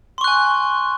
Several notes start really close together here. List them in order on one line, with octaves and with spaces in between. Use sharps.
C6 C#6 F#6 G#5